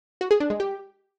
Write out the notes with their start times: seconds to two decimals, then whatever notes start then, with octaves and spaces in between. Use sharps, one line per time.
0.21 F#4
0.31 G#4
0.40 D4
0.50 G#3
0.60 G4